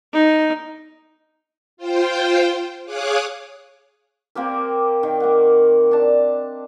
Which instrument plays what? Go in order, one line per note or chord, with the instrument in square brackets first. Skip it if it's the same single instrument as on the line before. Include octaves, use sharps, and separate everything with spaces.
[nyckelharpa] D#4
[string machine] F4 C5 G5
G#4 C#5 F5 D6 D#6 F#6
[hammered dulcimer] A#3 C4 G4 A#4
D#3
A#3 F#5
D4 A5